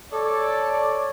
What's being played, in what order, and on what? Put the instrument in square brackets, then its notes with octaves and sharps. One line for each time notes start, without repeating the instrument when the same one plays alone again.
[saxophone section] A4 [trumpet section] C#5 D5